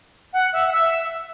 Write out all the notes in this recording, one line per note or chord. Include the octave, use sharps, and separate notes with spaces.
F#5
E5
F#5
E5